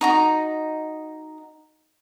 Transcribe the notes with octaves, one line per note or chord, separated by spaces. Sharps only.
D#4 F#4 A#5